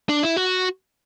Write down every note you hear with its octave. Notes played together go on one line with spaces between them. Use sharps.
D4
E4
F#4